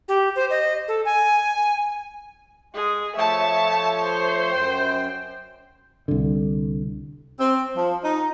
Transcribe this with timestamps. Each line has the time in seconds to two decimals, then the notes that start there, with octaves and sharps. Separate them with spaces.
0.08 G4
0.36 C5
0.50 D#5
0.88 A4
1.05 G#5
2.74 G#3 G#4
3.16 F3 A3 C#5 E5 A5
4.04 C5
4.52 F#2 G5
6.08 C2 D3
7.40 C4
7.77 F3
8.04 D#4